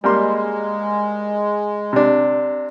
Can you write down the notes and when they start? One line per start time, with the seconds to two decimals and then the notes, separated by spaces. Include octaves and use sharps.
0.04 G3 G#3 A#3 C6
1.93 C3 D4